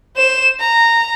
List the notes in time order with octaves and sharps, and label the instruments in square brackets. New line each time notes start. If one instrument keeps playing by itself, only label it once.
[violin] C5 E7
A#5